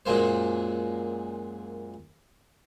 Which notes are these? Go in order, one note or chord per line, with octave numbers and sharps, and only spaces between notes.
F#2 A#2 G#3 A#3 C5